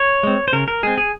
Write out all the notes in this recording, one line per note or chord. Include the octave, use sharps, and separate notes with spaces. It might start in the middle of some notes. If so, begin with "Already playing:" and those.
Already playing: C#5
G#3 C4
C5
C#3 A#4
A#4
G#3 C4 G#4
G#4